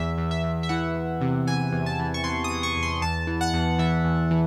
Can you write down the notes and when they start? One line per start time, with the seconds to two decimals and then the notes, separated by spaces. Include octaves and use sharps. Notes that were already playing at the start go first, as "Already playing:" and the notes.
Already playing: E2 E5
0.18 E2
0.31 E5
0.44 E2
0.63 E5
0.69 E3 F#5
0.96 E2
1.21 C3
1.47 E3 G#5
1.72 E2
1.86 A5
1.99 E3
2.14 C#6
2.24 E3 C6
2.44 D#6
2.50 E3
2.63 C#6
2.76 E2
2.83 C6
3.02 E2 A5
3.27 E3
3.41 F#5
3.54 E2
3.79 E3 E5
4.05 E2
4.31 E3